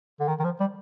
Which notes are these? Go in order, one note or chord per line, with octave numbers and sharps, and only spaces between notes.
D3
D#3
D#3
F3
G3